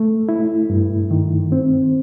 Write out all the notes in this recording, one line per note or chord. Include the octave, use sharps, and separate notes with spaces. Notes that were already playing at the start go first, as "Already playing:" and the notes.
Already playing: A3
E4
G2
D#3
C4